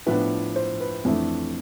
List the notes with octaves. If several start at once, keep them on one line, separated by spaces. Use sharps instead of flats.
A2 F3 B3 D4 B4
C5
B4
F2 E3 A3 D4